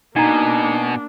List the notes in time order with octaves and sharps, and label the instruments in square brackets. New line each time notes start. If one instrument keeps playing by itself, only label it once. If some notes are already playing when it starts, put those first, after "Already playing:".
[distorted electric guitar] B2 [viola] A#3 D4 [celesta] D#4 A#5 [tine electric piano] G#5